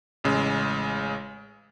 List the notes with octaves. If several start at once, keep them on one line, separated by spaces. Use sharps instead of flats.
A1 C#3 G#3